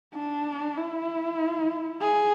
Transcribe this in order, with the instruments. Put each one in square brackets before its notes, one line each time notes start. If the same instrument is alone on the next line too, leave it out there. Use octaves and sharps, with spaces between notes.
[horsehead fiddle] D4
E4
G#4